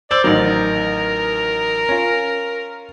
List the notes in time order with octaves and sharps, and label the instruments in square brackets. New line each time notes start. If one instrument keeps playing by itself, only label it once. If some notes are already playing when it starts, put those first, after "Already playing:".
[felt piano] C5 E6 G6 [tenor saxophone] D5
[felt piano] A1 D#3 F#3 [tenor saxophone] A#4
[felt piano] C#4 F4